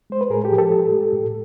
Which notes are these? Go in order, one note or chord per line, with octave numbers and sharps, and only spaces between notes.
G#3 C5
B4
A2 G#4 A#4
G4 A4
F3
G4 A4
A2
G#3
A2